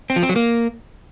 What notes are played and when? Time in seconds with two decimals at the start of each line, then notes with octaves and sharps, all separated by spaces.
0.10 C4
0.16 F3
0.23 C4
0.29 F#3
0.36 A#3